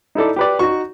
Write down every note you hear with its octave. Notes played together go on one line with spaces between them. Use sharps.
D#4 E4 A4 D5
G4 B4 D5
D#4 F#4 C#6